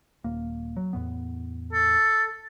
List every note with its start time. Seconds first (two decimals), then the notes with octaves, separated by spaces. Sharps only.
0.24 D#1 A#3
0.77 F#3
0.93 E2 A2 B3
1.73 A4